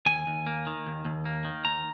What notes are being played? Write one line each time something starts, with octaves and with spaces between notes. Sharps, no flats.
D#2 G#5
D#2
A#3
D#3
D#2
D#2
A#3
D#3
D#2 A#5